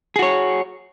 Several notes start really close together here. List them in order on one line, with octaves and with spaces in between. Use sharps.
G#4 F#4 C#5